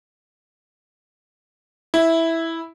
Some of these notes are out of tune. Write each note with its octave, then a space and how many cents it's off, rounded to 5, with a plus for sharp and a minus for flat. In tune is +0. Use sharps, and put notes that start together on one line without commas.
E4 -5